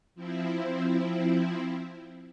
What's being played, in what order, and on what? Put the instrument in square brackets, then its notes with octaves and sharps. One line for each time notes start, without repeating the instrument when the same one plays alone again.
[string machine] F3 C4 E4